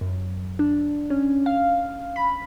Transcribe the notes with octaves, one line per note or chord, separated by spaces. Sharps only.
F#2
D4
C#4
F5
B5